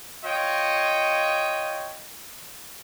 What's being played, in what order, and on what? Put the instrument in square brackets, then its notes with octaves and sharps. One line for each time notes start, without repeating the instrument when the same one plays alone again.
[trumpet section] F4 C#5 D#5 G5